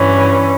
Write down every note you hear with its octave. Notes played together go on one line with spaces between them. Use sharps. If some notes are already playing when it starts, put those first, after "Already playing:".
Already playing: G2 E3 C#4